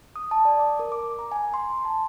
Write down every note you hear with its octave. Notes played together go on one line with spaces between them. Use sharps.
D#6
A5
D5
D6
A#4
D6
A#5
G#5
C6
A5